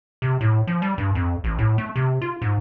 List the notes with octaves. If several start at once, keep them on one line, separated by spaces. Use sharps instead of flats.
C3
A2
F3
G3
G2
F2
A1
A2
A3
C3
F4
G#2